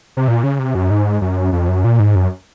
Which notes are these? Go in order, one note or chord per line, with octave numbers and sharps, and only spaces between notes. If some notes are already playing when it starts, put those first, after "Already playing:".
C3
A#2
C#3
C3
F#2
G#2
F#2
F2
F#2
A#2
G#2
F#2